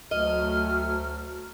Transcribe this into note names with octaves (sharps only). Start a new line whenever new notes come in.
D2 F#3 A3 D#5 F6